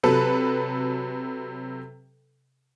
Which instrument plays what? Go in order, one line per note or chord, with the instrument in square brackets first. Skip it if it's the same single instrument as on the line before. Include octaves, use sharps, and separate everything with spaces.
[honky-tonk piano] C3 F#3 A4 B4